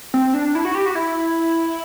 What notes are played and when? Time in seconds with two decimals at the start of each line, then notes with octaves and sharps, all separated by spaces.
0.14 C4
0.34 D4
0.55 E4
0.65 F#4
0.75 G4
0.86 F#4
0.95 E4